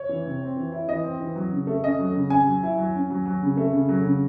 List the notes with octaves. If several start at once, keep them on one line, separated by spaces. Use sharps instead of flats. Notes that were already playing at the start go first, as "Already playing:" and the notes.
Already playing: C#5
E3
C3
C4
E3
E4
E3 D#5
C4
E3
F#3
C#3
A3
C#4 D#5
F#3
C#3
C#4 G#5
F#3
E4
F#3
C#4
F#3
F#3
C#3
A3
C#3
F#3
C#3